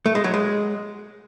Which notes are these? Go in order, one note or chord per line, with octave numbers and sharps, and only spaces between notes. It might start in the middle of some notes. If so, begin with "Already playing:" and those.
A3
G#3
F#3
G#3